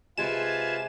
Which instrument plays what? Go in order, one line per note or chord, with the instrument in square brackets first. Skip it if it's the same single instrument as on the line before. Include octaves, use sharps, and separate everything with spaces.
[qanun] C3 G#3 [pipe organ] F4 B4 A5 [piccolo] G#5 [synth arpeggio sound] E7